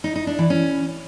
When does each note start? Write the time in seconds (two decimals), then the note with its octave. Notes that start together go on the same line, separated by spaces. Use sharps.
0.04 D#4
0.16 D#4
0.27 D4
0.39 E3
0.50 C#4